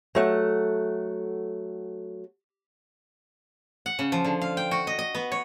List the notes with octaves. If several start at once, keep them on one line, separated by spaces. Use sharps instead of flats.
F#3 A3 F#5
F#5
C#3
F3
D3
F5
G5
F#4
D#5
D#5
B3
C#5